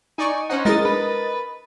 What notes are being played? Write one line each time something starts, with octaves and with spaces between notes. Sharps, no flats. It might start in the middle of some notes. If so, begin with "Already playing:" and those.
D#4 D5 G#5 C#6
C#4 D#4 C5 F#5
G#3 E4 G#4 A#4 D#5 A6
D4 B4